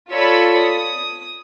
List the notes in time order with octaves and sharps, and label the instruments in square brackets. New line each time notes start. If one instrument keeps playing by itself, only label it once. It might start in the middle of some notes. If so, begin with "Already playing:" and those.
[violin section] F4 A4 C#5 D5 B5 E6
D#6